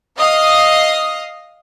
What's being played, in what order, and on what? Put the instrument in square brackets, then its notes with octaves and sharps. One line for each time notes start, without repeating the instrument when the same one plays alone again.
[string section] D#5 F5 D#6